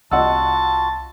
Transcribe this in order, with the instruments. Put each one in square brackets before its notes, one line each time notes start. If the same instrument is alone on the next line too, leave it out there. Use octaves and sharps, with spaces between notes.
[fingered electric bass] C2 C4 [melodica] F4 F#4 [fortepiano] D#5 F#5 E6 [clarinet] A5